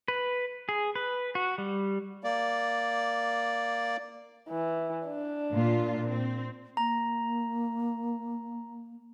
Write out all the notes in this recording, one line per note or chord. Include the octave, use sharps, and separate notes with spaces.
B4
G#4
B4
F#4
G3
A#3 D5
E3
D4
A#2 F4
C4
A#3 A#5